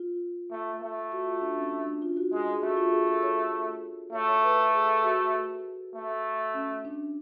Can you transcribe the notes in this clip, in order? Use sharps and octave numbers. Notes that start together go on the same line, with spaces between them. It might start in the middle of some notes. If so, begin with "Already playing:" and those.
Already playing: F4
A3
A3
F#4
F4
D4
C#4
D4
D4
F4
F#4
G#3 G#4
G#4
A3 F#4
F4
G#4
A4
C#5
A3 C#5
C#5
B4
A4
G#4
F#4
A3
C#4
D4